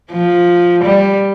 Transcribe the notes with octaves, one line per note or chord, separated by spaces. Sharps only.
F3
G3